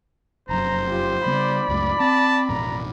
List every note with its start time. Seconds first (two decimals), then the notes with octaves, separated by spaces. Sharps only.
0.49 F1 F#2 C5 A#5
0.87 F4 G4
1.26 C#3 G3 B3 D5 B5
1.68 C#2 F#2 A3
2.00 C4 A5
2.49 A1 F2 B2 A#5